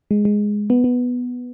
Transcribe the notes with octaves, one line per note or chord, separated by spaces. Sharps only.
G#3
G#3
B3
B3